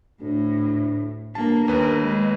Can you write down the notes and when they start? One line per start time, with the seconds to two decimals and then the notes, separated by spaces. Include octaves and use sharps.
0.21 D2 A2
1.35 G1 A#3 A5
1.68 D#2 A#4 B4
2.01 G#3